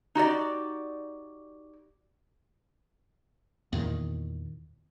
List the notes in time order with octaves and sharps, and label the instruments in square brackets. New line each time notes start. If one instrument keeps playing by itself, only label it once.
[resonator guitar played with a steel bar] D#4 F#4 G4 D5
[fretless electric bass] E2 A#2 D#3